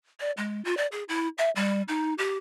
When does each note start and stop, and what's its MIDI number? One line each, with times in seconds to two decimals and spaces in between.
0.20 0.31 74
0.37 0.63 56
0.65 0.77 65
0.77 0.87 74
0.92 1.03 68
1.09 1.28 64
1.38 1.50 76
1.56 1.82 55
1.88 2.14 63
2.18 2.38 67